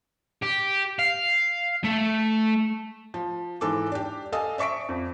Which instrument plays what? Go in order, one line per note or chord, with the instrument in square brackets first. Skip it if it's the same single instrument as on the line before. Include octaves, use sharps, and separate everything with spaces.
[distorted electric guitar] G4
F5
A3
[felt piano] F3
G#2 E3 A4 D6
D4 G4
A4 D#5 F5 G#5 D#6
D5 E5 C#6 B6 D7
F2